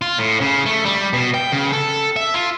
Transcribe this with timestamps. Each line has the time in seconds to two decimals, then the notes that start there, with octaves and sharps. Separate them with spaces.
0.02 F4
0.18 A2
0.41 C#3
0.66 A3
0.85 G3
1.13 B2
1.34 G5
1.52 C#3
1.72 A4
2.16 E5
2.34 F4